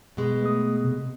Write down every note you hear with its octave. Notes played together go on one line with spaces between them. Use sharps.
B2 G#3
A3 D#6
C3